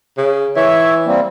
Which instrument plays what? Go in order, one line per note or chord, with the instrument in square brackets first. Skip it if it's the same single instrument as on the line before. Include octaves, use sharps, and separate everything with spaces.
[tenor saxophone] C#3
[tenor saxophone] E3 [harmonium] C#5 E5
[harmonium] G3 A#3 C4